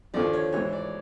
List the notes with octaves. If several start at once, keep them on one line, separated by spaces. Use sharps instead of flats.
D#2 D3 F3 D5
C#5
G#2 E3 G#3 C#5
D5